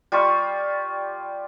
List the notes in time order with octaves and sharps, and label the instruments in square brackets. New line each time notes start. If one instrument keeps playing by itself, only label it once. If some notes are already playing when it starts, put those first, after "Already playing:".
[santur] G3 F4 B5 C#6